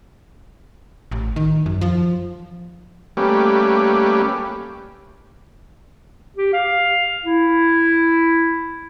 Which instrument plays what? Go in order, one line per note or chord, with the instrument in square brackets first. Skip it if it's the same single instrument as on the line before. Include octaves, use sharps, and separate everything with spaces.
[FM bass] A1
D#3
F#2
F3
[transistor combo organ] G3 A3 A#3 C#4 G4 B4
[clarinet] G4
F5
E4